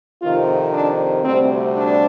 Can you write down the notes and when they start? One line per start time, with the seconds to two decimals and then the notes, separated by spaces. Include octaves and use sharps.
0.22 F2 C3 D#3 F4
0.73 D4
1.24 D2 C3 G3 C4
1.75 D4